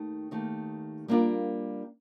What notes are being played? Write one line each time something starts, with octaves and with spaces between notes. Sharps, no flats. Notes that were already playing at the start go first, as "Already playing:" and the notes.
Already playing: D#2 D#3 A3 D#4
D#2 D#3 A3 D#4
G3 A#3 D4 F4 A#4